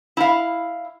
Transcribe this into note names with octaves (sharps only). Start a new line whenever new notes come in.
E4 F5